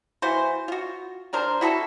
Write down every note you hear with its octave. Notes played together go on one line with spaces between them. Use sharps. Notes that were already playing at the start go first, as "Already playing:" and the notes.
E3 A#3 F#4 C5
F4 F#4
G3 D4 A#4 C5
E4 F#4 G#4 A4